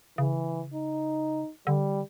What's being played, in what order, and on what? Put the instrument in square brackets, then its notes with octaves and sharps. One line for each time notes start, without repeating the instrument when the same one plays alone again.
[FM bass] C#3 [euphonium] E3
[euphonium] D#4
[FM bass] D3 [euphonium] G3